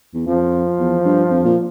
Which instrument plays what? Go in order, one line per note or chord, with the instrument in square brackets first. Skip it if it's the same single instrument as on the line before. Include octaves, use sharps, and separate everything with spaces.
[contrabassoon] E2
[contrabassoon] F2 [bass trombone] F3
[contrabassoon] E2
G2
F2
A#2